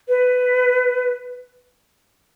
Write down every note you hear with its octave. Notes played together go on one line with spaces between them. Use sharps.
B4